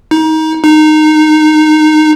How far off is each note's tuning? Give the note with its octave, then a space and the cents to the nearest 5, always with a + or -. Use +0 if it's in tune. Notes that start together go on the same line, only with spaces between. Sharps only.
D#4 +25
D#4 -15